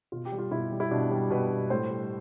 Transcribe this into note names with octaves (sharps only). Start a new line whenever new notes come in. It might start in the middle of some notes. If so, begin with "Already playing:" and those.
B2 F4
G4
G3
F4
B2 E4
G3
E4
B2 D4
G3
B2 B4
G3
A2 C5
G3